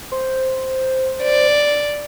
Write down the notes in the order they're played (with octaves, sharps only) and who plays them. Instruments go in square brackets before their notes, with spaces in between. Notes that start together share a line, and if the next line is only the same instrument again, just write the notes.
[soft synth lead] C5
[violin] D5